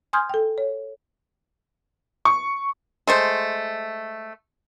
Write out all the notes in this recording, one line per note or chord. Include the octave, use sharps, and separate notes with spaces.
G#5 C6 D#6 F6 G6 G#6
A4 G5
C#5
C#6
G#3 A3 C5